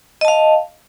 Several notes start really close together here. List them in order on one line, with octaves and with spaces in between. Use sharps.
D#5 A5 F5